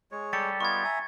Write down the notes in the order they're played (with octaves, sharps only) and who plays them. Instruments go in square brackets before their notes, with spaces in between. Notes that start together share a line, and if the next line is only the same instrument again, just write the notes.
[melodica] G#3 C#5
[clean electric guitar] G3 G4 A4 [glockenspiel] A6 C#7
[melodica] B3 F4 D#5 [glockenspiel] C#6 G#6
[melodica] E5 G#5 A#5